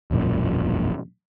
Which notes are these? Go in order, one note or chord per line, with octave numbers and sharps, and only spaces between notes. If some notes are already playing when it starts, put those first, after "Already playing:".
E1 A#1 F#2 A#2